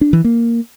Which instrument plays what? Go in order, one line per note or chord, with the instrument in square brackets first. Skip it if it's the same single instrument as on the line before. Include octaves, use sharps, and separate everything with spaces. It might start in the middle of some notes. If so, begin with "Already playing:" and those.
[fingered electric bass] D4
E3
A#3